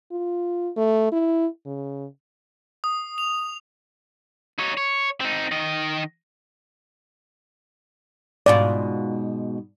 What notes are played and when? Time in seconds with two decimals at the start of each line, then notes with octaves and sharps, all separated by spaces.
0.11 F4
0.76 A3
1.12 E4
1.65 C#3
2.84 D#6
3.18 F7
4.59 D#4 C#5
4.77 C#5
5.20 C4 D#4
5.51 D#3 D#5
8.46 G#2 B2 F4 D5